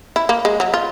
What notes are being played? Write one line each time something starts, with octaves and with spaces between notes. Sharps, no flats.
E4
A#3
G#3
F#3
F4